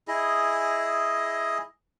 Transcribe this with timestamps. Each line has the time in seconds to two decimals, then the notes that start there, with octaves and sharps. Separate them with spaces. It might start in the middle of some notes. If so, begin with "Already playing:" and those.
0.08 E4 G#4 D#5